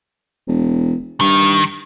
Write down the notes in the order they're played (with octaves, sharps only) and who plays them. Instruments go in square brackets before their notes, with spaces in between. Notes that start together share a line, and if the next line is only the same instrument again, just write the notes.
[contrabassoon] E1
[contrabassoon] G2 [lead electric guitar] D#3